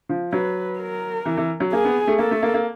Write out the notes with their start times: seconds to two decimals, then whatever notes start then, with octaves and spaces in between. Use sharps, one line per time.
0.09 F3
0.33 F#3 B4
0.79 A#4
1.26 E3
1.37 E3
1.60 F#3
1.72 A#3 G#4
1.85 B3
2.07 A3
2.18 A#3 A4
2.31 A3
2.43 A#3
2.54 A#3